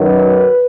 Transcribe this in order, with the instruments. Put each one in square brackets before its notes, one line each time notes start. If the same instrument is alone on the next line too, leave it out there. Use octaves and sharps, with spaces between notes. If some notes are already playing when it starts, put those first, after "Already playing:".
Already playing: [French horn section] F#2 D#3 F#3 B4